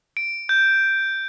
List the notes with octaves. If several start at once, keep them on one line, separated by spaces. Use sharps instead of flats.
D7
G6